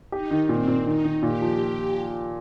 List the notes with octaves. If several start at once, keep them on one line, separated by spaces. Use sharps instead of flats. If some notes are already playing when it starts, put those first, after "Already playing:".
D#4 G4
D#3
A#2 C4
A#2
D#3 D#4
D#3
A#2 G4
F3